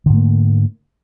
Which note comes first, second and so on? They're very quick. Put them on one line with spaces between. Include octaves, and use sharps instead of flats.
D3 G#2 A3 A#3